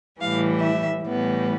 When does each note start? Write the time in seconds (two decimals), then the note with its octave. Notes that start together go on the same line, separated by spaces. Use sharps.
0.20 A2 E3 G3 F5
0.61 E5
1.02 A2 E3 G3 B3